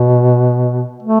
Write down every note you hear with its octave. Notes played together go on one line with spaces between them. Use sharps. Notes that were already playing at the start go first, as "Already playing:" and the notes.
Already playing: B2
A3